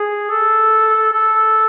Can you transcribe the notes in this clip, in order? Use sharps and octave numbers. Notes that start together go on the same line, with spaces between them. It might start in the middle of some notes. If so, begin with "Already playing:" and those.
Already playing: G#4
A4
A4